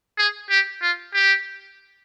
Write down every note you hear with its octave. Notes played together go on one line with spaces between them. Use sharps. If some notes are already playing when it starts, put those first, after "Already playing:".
G#4
G4
F4
G4